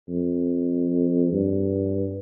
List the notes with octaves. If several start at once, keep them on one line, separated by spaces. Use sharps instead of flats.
F2
G2